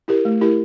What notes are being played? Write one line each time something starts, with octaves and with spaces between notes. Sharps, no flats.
E4 G4 A#4
A3
E4 G4 A#4